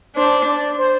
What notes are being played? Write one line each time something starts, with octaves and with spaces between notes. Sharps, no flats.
D4 C5
D5
C5